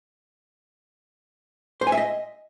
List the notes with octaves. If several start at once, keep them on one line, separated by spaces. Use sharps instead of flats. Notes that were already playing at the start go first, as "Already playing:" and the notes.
C5
G#5
E5
D#5